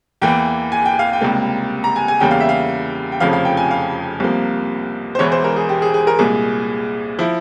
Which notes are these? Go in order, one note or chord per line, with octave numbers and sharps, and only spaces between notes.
E2 E3 A#3 G5
G#5
G5
F5
G5
C#2 C3 G3 A#3
A#5
G#5
G#5
E2 C#3 G3 A#3 G5
F5
E5
F5
G5
F1 F2 C#3 F3 F5
F5
G5
G#5
F5
C2 C3 F3 A#3
C5
E1 E2 E3 G#3 C#5
C5
A#4
G#4
G4
G#4
G#4
A#4
C2 A#2 G#3 G#4
F3 E4